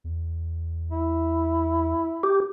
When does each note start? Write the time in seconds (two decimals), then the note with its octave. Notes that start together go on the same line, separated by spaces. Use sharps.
0.04 E2
0.91 E4
2.23 G4